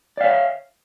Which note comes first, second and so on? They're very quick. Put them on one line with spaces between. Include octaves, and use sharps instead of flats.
D5 F5 C#5 E5